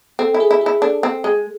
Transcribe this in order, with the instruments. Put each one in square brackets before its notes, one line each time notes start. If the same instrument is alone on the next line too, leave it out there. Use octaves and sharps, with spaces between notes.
[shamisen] C4 [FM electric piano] A4
[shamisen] E4
[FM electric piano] G#4
[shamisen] E4
[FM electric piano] G#4
[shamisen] E4
[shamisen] D4 [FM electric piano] A4
[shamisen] C4
G#3